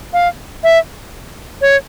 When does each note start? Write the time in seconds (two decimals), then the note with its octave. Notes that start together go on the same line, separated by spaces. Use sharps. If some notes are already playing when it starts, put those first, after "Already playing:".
0.13 F5
0.64 E5
1.61 C#5